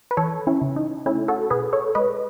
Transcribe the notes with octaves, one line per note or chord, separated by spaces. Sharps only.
B4
E3 A4 C#5
C#4 E4
C#3
D#4
A3 C#4 E4
F#4 A4
B2 G#4 B4
A4 C#5
G#3 B4 D#5